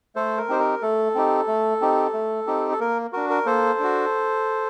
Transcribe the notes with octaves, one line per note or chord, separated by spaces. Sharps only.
A3 A4 C5
A#4
C4 D#4 G4 C5
A#4
A3 A4
C4 D#4 G4
A3
C4 D#4 G4
A3
C4 D#4 G4
A4
A#3 A#4
D4 F#4 A#4
A#4
A#3 A4 C5
D4 F#4